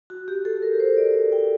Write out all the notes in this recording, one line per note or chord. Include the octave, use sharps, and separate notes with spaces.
F#4
G4
A4
A#4
C5
D5
D5
G5